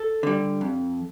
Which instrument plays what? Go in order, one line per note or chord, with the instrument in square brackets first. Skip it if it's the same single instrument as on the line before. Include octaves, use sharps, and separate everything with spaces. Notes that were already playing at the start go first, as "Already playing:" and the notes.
Already playing: [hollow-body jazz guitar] A4
D3 G3
F2